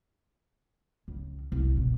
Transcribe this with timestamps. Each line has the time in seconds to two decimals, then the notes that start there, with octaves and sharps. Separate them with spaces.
1.08 C#2
1.52 C2
1.77 B2